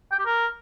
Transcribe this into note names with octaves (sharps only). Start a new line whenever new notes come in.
G5
G4
A#4